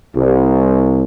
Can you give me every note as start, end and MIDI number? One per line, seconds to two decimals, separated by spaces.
0.14 1.01 36